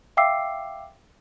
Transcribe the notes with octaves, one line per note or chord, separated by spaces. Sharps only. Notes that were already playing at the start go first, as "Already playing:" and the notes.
E5 F5 G5 D6 E6 C7